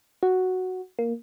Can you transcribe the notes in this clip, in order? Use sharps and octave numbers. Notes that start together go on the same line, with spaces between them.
F#4
A#3